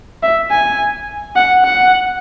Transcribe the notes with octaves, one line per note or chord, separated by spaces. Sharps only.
E5
G#5
F#5
F#5